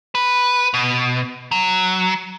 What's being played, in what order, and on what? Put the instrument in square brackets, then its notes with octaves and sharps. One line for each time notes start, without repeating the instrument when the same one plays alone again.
[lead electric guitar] B4
B2
F#3